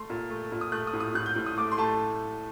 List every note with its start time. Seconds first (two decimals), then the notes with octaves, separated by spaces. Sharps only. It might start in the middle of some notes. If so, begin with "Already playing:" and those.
Already playing: A3 C6
0.10 A#2
0.30 A3
0.52 A#2
0.61 D#6
0.72 A3 F#6
0.87 D#6
0.93 A2
1.00 D#6
1.14 A2 F#6
1.26 G6
1.36 A2
1.46 D#6
1.57 A3 D6
1.71 C6
1.78 A3 A5